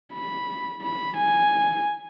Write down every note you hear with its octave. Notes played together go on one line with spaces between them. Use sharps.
B5
B5
G#5